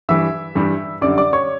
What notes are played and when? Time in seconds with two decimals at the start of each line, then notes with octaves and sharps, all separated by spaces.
0.09 G2 E3 G3 E5 E6
0.55 G2 E3 G3
1.01 F#2 D3 G3 D5 D6
1.18 D5 D6
1.33 C#5 C#6